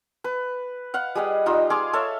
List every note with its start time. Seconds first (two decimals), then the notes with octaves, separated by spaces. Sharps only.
0.24 B4
0.94 F5 F#5
1.15 G3 G#4 D#5 F#5
1.46 G3 D#4 F4
1.70 G#4 F5 C6 D6
1.93 A4 C#5 E5 F5